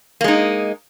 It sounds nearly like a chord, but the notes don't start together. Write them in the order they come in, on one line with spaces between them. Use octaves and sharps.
A#3 G#3 D#4